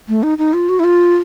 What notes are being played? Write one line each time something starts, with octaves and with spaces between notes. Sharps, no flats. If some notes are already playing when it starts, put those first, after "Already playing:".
A3
D#4
D#4
F4
F#4
E4
F4